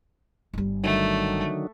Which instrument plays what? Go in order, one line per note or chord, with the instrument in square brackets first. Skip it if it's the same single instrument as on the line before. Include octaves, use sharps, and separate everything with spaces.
[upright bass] G1 G3
[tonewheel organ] D3 D#3 F#3 [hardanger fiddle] A3